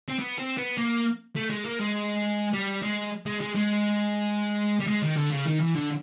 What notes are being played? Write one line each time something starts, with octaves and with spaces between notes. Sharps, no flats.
C4
B3
C4
B3
A#3
A3
G#3
A#3
G#3
G3
G#3
G#3
G#3
G#3
G3
G#3
D#3
D3
C#3
D#3
E3
D3